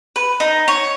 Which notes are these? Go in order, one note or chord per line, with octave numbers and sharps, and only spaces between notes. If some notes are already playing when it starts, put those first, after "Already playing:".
B4
D#4
C#5